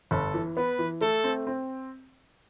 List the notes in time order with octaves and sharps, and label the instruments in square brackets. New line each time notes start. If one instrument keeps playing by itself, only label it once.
[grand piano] G1 [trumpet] A4
[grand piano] E3
[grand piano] B3 [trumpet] B4
[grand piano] E3
[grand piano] A3 [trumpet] A4
[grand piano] C4
C4